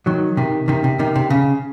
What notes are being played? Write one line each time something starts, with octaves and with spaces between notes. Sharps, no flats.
D#3 F#3
C3 D#3
C3 D#3
C3
C3 D#3
C3
C#3